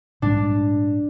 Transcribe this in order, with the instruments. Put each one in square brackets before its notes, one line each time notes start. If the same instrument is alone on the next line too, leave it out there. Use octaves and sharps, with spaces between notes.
[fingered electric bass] A#1 G#2 G3 [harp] D4